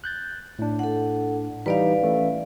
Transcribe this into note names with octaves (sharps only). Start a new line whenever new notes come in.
F#6 G6 A6
A2 D4
A4 F#5
E3 G3 D#4 B4 D5 F5
E3 A3 C#4